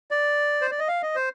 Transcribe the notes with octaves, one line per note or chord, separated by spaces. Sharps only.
D5
C5
D5
D#5
F5
D#5
C5